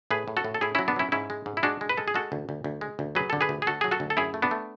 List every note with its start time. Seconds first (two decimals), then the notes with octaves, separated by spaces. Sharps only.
0.11 A2 G#4 B4
0.28 A2
0.37 F#4 A4
0.44 A2
0.54 A4
0.61 A2 E4 G#4
0.75 F#3 C#4 E4
0.88 B3 D4
0.96 F#3 C#4 E4
1.12 G#2 C#4 E4
1.30 G#3
1.46 G#2
1.57 E4
1.63 G#3 D4 F#4
1.81 G#3
1.89 B4
1.97 G#3 A4
2.08 G#4
2.14 G#3 F#4 A4
2.32 D2
2.49 D2
2.64 D2
2.81 G#3
2.99 D2
3.15 F#3 G#4 B4
3.30 D3 A4
3.41 G#4 B4
3.49 D2
3.62 G#4
3.67 D2 F#4 A4
3.81 F#3 G#4
3.91 F#4 A4
4.00 D2
4.10 A4
4.17 F#2 E4 G#4
4.34 A3
4.42 B3 D4
4.51 A3